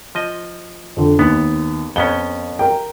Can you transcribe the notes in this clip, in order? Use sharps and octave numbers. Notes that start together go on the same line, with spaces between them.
F3 D#5
F2 D3
D#2 B3
F2 B3 C#4 G7
A#4 G5